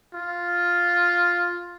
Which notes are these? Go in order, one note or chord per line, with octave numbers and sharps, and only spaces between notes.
F4